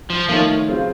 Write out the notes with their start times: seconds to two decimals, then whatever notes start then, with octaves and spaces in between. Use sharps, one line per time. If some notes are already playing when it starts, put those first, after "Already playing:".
0.10 F3
0.29 D#3 F3 A3 D#4 A4 C#5
0.68 C#3 F#3 C4 F4 C5